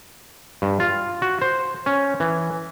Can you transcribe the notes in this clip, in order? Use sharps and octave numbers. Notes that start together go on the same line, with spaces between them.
G2
F4
F#4
C5
C#4
E3